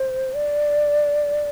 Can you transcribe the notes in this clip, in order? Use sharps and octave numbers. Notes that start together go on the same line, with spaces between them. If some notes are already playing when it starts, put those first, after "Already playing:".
Already playing: C5
D5